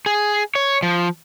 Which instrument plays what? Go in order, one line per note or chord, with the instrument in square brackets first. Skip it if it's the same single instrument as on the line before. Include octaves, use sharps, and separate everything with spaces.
[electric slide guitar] G#4
C#5
F3